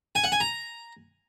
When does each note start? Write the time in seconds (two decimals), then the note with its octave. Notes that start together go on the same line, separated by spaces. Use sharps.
0.15 G#5
0.24 F#5
0.32 G#5
0.40 A#5